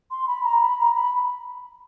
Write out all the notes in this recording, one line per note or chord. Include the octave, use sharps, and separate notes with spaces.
C6
B5
A#5
B5
A#5
B5